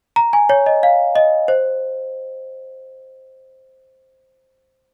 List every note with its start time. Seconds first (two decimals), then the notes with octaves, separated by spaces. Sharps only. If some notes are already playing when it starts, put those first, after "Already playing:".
0.16 A#5
0.33 G#5
0.49 C#5
0.66 D#5
0.83 F5
1.16 D#5
1.48 C5